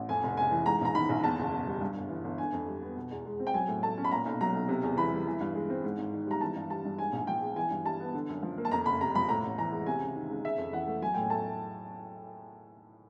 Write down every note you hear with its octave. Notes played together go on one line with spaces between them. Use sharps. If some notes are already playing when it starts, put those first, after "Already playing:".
Already playing: A1
F2 G#5
F1
C#3 G#5
E3
G#2 A#5
A#1 A#5
D#3 B5
A#1
E2 A5
F#1
B2
G3
G2
G1
E3
G1
D3 G#5
F2
G3
B3
B2
E2
G#3
C4
G5
F#3 G#5
A2
A3 A5
C#4
B5
A#2 A#5
B1
F#3 A#5
B1
C3
E2
E3 B5
G3
E3
G2
G#3
C4
G#2
G#1
D#3
G3 A#5
E3 A5
G2
G3 A5
G2
G#2 G#5
A#1
F3 G5
G#3
E3 G#5
G2
G3 A5
B3
D3
F#2
F3
A#3
A5
F2 A#5
F#1 B5
C3 A#5
F3 B5
A2 A#5
A1
E3 A#5
G#3
C3 G#5
C#2
D#3
C#2
C#3 E5
F2
E3 F#5
A3
F#3 G#5
A2 G5
G#5
A3 A5